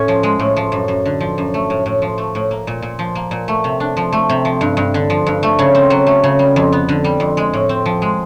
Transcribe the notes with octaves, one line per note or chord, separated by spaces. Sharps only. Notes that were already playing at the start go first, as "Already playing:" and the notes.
Already playing: A2 C#4
F3
G#3
A2
F3
F#2
F#2
D3
F3
F#2
A3
A2
A2
F3
A3
A2
A#3
A#2
A#2
F3
A#3
A#2
A3
C3
D4
F3
A3
C3
F3
G2
G2
D3
F3
G2
A3
C#3
C4
F#3
A3
C#3
G3
F2
B3
D3
G3
F2
G#3
A2
C4
F3
G#3